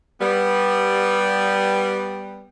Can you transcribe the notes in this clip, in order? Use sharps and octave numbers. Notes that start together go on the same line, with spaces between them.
G3 B3